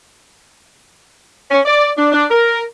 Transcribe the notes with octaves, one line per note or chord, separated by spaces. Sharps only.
C#4
D5
D4
D4
A#4